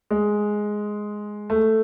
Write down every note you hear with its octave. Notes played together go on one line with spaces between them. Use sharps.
G#3
A3